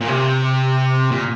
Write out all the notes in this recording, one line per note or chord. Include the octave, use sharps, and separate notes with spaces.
A#2
C3
A#2